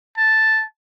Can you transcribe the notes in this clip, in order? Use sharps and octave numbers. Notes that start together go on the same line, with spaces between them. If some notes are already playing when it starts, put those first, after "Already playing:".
A5